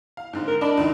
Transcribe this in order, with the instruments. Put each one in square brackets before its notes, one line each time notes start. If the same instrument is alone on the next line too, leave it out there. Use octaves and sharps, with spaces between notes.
[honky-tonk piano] F5
G#2 D3 C4
[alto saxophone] A#4
[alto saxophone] D4 [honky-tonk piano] D#5 A5 B5
[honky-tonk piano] C#2 D3 D#3